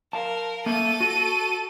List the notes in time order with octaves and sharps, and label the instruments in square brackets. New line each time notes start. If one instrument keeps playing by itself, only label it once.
[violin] A#4 [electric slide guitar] F5 A5
[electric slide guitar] A#3 E5 [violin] A4 D#7
[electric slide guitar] F#4